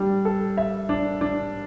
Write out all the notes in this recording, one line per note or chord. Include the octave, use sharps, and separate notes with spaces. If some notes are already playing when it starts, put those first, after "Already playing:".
Already playing: G3 D4
A4
E5
D4
D4